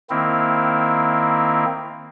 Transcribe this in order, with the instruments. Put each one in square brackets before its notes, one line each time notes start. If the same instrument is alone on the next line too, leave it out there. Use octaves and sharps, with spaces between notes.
[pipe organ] D#3 A#3 C4 E4